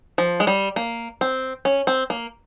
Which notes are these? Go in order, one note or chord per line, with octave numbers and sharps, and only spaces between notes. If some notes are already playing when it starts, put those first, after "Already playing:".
F3
G#3
G3
A#3
C4
C#4
C4
A#3